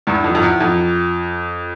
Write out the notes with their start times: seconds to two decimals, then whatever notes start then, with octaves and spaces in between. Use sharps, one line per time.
0.07 E2 G2
0.24 F2
0.35 F2
0.43 E2
0.60 F2